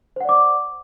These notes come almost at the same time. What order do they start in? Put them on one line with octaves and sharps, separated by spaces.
C5 F#5 D5 D6